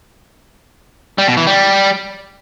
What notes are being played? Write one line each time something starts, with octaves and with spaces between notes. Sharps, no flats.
G3
B2
E3
G3